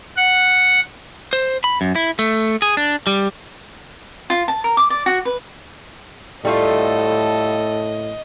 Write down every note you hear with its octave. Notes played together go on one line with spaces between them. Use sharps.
F#5
C5
B5
F#2
E4
A3
G#4
D4
G3
F4
A5
A#4
D6
D5
F#4
B4
A2 G3 A3 F4 A4 D#5